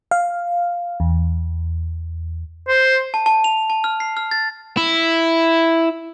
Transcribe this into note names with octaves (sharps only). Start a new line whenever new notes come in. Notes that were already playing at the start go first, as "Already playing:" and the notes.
F5
E2
C5
A5
A5
F7
A5
F6
C7
F6
A6
E4